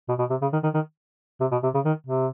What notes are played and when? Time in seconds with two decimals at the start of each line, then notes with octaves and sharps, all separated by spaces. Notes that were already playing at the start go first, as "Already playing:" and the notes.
0.09 B2
0.19 B2
0.30 C3
0.42 C#3
0.53 D#3
0.63 D#3
0.74 D#3
1.41 C3
1.52 B2
1.63 C3
1.74 C#3
1.85 D#3
2.07 C3